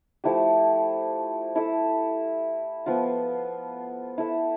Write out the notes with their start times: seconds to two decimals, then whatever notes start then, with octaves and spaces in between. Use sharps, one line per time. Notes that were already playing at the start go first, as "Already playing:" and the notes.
0.24 F3 A3 E4 G4
1.55 E4 A4 E5
2.86 F3 B3 F4
4.18 E4 A4 E5